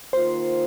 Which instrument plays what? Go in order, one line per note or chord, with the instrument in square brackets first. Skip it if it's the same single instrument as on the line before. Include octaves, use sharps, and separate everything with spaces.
[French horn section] D#3 A#3 F4 [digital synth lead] C5